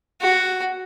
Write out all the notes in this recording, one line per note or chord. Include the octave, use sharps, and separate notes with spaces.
F#4